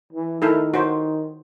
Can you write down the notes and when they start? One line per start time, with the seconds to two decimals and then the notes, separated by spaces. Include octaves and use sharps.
0.13 E3
0.42 D#3 E4 A4 A#4
0.74 F#4 C5